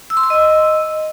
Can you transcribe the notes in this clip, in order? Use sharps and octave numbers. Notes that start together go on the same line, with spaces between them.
E6
C6
E6
D#5